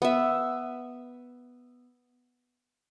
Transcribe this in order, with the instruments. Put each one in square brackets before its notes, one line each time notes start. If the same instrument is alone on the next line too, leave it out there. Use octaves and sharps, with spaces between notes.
[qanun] B3 E5